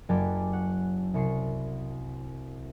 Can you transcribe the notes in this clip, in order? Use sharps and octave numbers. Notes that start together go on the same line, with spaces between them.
F#1 F#3 G4 G#5 A5 D6
C#5 F#5
C2 C#6 C7